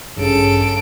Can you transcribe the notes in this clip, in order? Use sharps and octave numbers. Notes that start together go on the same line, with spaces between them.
A1 G2 C#3 A4 D7